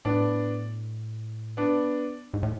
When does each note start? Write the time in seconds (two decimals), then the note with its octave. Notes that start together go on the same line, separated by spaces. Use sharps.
0.05 A2 B3 D4
1.57 B3 D4
2.34 G#2
2.43 A2